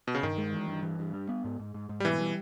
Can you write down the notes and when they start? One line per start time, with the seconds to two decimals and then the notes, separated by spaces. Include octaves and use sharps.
0.07 B2
0.15 C#3
0.23 G2 D#3
0.38 G#3
0.53 E3
0.68 G2
0.83 E3
0.99 G2
1.14 G3
1.29 B3
1.44 G#2
1.60 G#2
1.74 G#2
1.89 G#2
2.00 G3
2.05 B2 E3
2.20 G3